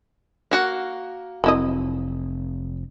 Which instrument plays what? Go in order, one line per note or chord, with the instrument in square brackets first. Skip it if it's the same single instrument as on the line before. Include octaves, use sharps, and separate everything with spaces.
[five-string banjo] A#3 F#4 F#5
[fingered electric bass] F1 C4 [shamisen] F#3 E4 D#5